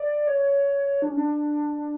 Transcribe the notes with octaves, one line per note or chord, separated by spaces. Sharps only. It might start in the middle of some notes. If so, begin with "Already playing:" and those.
Already playing: D5
C#5
D4
C#4
D4